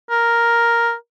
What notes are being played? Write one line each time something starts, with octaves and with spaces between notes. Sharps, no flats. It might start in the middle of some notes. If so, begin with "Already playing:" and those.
A#4